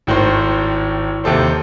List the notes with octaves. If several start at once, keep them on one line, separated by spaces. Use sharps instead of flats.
G#1 A2 D#3 C5
D#2 C3 A4 C5